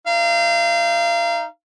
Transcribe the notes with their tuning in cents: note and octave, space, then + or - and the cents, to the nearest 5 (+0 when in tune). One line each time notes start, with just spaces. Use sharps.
D#4 +0 F5 -30